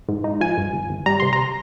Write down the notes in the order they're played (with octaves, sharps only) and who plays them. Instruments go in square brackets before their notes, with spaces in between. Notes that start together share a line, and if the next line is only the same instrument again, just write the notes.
[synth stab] G#2
D#4
F3 G#5
G2
G1
G1
G3 A#5
C3 C6
A#5